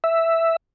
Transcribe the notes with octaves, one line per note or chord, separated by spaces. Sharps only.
E5